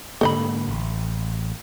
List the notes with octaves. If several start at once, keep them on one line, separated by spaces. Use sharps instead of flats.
G#2 D3 A#3 A4 D#5 B5
A1